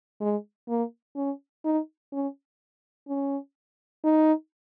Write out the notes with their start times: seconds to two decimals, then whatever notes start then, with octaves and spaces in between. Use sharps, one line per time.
0.21 G#3
0.68 A#3
1.16 C#4
1.64 D#4
2.12 C#4
3.08 C#4
4.04 D#4